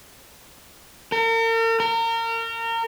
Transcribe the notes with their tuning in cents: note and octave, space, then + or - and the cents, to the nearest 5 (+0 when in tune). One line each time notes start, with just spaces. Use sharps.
A#4 -45
A#4 -30